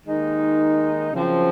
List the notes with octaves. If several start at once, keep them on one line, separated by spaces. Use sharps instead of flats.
D#2 D#3 G#3 D#4
F#2 C#3 F3 C4